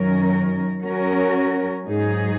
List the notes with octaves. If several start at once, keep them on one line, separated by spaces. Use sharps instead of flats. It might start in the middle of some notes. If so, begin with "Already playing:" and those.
Already playing: F#2 D#3 F#3 C#4 A#4
F#3 C#4 F#4 A#4
G#2 F#3 D#4 G#4